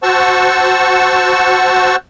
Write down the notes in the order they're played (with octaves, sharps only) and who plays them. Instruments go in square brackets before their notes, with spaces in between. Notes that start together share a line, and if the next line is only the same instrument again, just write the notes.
[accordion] F#4 C5 F#5 A5 C#6 E6